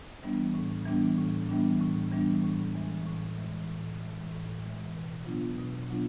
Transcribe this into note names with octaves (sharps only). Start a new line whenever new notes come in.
E3 G3 B3 D4
A2
E3 G3 B3 D4
A2
E3 G3 B3 D4
A2
E3 G3 B3 D4
A2
E3 G#3
A2
E3 G#3
A2
E3 G#3
A2
E3 G#3
B2
F#3 B3 D4 F4
B2
F#3 B3 D4 F4